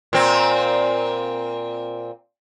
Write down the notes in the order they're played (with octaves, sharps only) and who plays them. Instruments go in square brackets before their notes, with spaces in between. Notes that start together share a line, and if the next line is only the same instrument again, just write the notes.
[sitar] A#2 C4